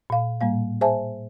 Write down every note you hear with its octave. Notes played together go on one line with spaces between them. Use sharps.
A#2 F5
A2 G3 A#3 F5
G#4 C5 E5 G#5 A5